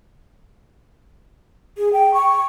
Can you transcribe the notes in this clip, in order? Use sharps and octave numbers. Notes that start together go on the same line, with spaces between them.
G#4
G5
C#6